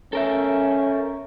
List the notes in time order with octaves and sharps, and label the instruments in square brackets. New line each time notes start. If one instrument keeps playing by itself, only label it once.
[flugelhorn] C#4 [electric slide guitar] A4 A#4 E5